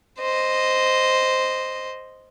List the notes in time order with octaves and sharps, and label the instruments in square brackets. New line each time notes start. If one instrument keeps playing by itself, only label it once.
[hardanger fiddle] C5 D#5